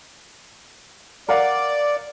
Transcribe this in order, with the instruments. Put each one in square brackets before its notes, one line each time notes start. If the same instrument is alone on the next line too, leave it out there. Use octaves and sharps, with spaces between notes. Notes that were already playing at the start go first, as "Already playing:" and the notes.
[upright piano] A#4 F5 F#5 [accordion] D5